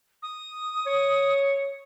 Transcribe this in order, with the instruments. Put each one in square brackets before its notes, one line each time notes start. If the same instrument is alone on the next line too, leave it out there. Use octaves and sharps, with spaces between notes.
[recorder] D#6
[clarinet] C#5